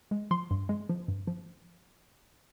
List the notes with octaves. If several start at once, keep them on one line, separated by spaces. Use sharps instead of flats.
G#3
F3 C6
G2
G#3
F3
G2
F3